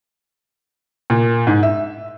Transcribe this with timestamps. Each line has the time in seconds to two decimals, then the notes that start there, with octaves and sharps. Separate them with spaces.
1.10 A#2
1.47 G#2
1.63 E5